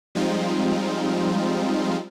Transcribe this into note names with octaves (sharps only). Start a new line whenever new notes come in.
F3 G3 G#3 C4 D#4 F4